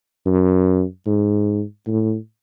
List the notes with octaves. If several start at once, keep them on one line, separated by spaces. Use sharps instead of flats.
F#2
G#2
A2